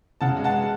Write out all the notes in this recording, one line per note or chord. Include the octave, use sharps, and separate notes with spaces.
C#3 F#5 A5
G#3
F#5 A5